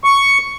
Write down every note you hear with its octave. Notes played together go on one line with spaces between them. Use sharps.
C#6